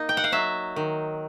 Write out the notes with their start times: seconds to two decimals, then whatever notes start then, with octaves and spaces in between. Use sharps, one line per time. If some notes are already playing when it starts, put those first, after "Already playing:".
Already playing: A#3 D#4
0.09 G5
0.17 F#5
0.24 F5
0.32 F#3 E5
0.76 D#3